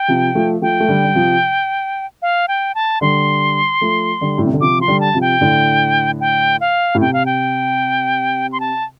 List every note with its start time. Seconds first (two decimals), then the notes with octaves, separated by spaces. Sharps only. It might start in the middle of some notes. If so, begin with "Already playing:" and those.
Already playing: G5
0.08 C3 F3
0.35 F3 A3
0.62 F3 A3 G5
0.80 A3
0.88 D3 G3
1.04 G3
1.15 C3 F3
2.22 F5
2.48 G5
2.75 A5
3.01 D3 G3 C6
3.81 F3 A3
4.21 D3 G3
4.38 A2
4.46 C3
4.54 D3
4.61 C3 F3 D6
4.79 F3 C6
4.88 D3 G3
5.00 A5
5.14 C3 F3
5.21 G5
5.41 A2 D3
6.20 G5
6.61 F5
6.95 A2
7.01 C3 G5
7.13 F5
7.26 G5
8.52 C6
8.60 A5